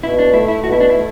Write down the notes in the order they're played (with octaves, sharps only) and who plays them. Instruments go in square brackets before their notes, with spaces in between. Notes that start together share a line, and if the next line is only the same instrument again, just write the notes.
[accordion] B2 [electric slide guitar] E4
[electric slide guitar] D4
[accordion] A3 [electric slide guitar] E4
[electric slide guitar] E4
[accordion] B2 [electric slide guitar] F#4
[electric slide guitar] E4
D4
E4
[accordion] A3